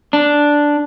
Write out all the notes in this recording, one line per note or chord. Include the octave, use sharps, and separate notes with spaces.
D4